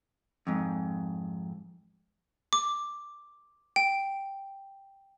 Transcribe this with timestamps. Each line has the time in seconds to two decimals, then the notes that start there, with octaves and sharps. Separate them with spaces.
0.47 F2 G#2
2.53 D6
3.76 G5